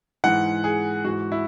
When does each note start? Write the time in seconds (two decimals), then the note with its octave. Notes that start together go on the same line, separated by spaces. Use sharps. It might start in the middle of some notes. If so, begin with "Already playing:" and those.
0.24 G#2 E3 F#5
0.64 G#4
1.05 G#2 F#4
1.08 E3
1.32 E4